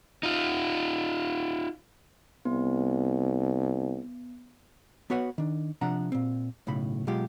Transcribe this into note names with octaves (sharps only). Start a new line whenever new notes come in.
D#4 F4
C2 B3
B3 F#4 B4 C#5 F#5
D#3 D4
C3 F3 D4 F#5 A#5
A#2 C4
B1 A2 C#3 B5
B2 F#3 G#3 F4 G4